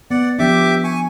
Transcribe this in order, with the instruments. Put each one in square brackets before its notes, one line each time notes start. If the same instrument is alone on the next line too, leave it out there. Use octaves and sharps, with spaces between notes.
[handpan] B3 [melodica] D5 F#5
[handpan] F3 B3 D4 [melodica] G4 E5 D6
[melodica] G#5 C#6